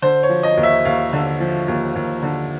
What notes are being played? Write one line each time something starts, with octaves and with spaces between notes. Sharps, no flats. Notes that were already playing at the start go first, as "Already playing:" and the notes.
D3 C5
C#5
F3
D#5
D#2
E5
D#2 F5
D3
F3
D#2
D#2
D3